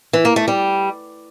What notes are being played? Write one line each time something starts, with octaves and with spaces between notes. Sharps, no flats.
E3
A#3
A3
G3